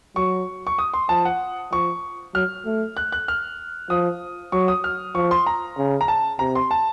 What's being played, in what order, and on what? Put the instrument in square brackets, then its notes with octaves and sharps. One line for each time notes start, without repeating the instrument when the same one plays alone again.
[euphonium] F#3 [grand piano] C#6
[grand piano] C#6
D#6
C6
[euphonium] F3 [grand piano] A5
[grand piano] F#5
[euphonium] F3 [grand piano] C#6
[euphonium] F#3 [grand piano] F6
[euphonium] A3
[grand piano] F#6
F#6
F6
[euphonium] F3 [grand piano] D#6
[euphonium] F#3 [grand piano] C#6
[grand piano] D#6
F6
[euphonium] F3 [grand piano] C#6
[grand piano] C6
A#5
[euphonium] C#3
[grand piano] A#5
A5
[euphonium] C3 [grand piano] A#5
[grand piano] C6
A5